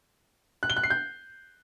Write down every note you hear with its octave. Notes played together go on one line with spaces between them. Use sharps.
F#6
G7
F#6
C7
G6